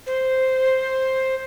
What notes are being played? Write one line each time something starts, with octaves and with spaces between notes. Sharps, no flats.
C5